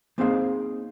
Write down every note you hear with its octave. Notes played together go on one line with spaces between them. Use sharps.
A#3 C4 D#4 G#4 C5 F5